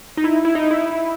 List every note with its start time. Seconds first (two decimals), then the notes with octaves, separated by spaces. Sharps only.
0.17 D#4
0.24 E4
0.45 E4
0.55 D#4
0.71 E4